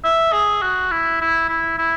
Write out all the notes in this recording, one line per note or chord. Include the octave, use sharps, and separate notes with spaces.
E5
G#4
F#4
E4
E4
E4
E4